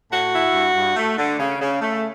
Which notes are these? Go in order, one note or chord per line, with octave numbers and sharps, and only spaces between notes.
A2 F#4
E4
G2
G2
A3
D3
C#3
C#3
A3